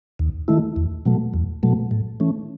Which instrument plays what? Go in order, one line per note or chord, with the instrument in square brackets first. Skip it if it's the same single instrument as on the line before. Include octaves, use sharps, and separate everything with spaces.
[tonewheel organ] D#2
D#3 A3 E4
E2
B2 F#3 A3
E2
B2 F#3 A3
A2
E3 A3 C#4